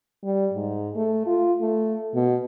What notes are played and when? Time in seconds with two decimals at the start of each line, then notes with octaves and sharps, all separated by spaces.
0.24 G3
0.54 G#2
0.96 A3
1.26 F4
1.61 A3
2.15 B2